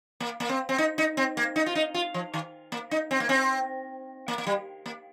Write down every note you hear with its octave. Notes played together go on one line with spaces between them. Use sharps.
A#3
A#3
C4
C4
D#4
D#4
C4
A#3
D#4
F4
D#4
F4
F3
D#3
A#3
D#4
C4
A#3
C4
A#3
A#3
G3
A#3